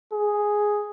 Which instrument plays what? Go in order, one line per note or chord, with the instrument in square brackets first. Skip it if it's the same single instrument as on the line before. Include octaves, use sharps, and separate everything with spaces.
[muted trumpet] G#4